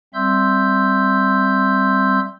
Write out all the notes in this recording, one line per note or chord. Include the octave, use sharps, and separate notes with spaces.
G3 C4 E5 C6 E6 G6